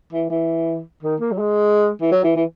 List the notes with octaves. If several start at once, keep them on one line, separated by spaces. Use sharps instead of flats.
E3
E3
D#3
A#3
F#3
G#3
E3
F#3
E3
E3